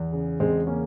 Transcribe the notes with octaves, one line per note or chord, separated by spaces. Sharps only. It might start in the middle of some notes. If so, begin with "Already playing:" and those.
Already playing: E2
C#3
E2 G#3 C4
C#3 A#3 C#4